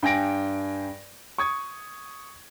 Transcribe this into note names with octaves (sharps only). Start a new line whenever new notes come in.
G2 G5 G#5 A#6 D7
C#6 D#6 G#6